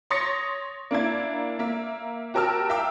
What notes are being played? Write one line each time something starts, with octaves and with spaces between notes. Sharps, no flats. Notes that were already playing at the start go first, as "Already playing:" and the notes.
C#5 C6 D#6 A6 A#6 C#7
A#3 D4 E4 G#6
A#3 E5
F#4 G4 A#4 A5 E6 F6
E5 F5 G5 D6 E6